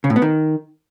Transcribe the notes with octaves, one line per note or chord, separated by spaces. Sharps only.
C#3
A2
B3
D#3